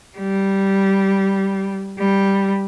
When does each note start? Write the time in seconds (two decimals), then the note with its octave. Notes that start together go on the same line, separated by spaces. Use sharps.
0.18 G3
1.99 G3